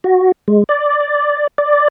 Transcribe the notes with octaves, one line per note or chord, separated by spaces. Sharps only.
F#4
G#3
D5
D5